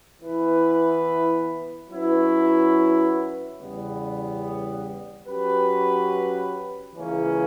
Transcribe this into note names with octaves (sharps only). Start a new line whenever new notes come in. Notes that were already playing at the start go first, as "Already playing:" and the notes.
E3 B3 E4 B4
F#3 C#4 E4 B4
E2 C#3 G3 B3
F#3 C#4 G4 B4
C#2 C#3 E3 A#3 C#4